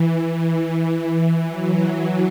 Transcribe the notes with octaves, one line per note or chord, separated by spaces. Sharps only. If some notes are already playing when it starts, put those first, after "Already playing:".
Already playing: E3
E3
E3
E3 F#3